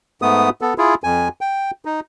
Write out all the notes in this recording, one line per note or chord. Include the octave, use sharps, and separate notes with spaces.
G#2 A3 B3 D#6
B3 A4
E4 F4 G#4
F2 G#5
G5
D#4